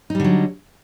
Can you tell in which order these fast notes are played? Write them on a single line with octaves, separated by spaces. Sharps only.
D#4 G3 D3 F#3